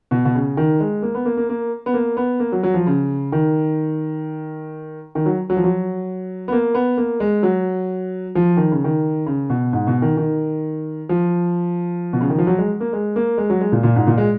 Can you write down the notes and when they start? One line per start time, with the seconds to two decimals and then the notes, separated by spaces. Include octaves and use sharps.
0.11 B2
0.25 B2
0.35 C#3
0.57 D#3
0.80 G#3
1.02 A#3
1.15 B3
1.26 A#3
1.37 A#3
1.49 A#3
1.86 B3
1.94 A#3
2.17 B3
2.40 A#3
2.52 F#3
2.63 F#3
2.74 F3
2.87 C#3
3.32 D#3
5.15 D#3
5.26 F#3
5.50 F#3
5.57 F3
5.64 F#3
6.48 B3
6.52 A#3
6.75 B3
6.97 A#3
7.20 G#3
7.43 F#3
8.35 F3
8.57 D#3
8.72 C#3
8.84 D#3
9.26 C#3
9.50 B2
9.73 G#2
9.87 B2
10.02 D#3
10.17 D#3
11.09 F3
12.13 B2
12.21 C#3
12.30 D#3
12.38 F3
12.47 F#3
12.58 G#3
12.80 A#3
12.93 G#3
13.16 A#3
13.38 G#3
13.50 F#3
13.61 G#3
13.72 A#2
13.83 A#2
13.96 G#2
14.07 A#2
14.18 G#3